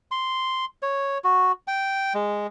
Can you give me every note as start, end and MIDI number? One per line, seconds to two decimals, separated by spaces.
0.11 0.65 84
0.82 1.18 73
1.24 1.52 66
1.68 2.13 79
2.14 2.47 56